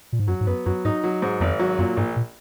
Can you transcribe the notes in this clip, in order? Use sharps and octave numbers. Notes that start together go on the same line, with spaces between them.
A#2
G#2
F#2 F#3
G#2
F#2 B3
F#2 F#3
G#2 D#4
F#3
G#2
G#1 F2
F#3
F#2 A#2
A#1 G#2
A#2